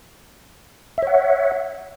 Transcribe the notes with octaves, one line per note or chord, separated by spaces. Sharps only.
C#5 E5 F#5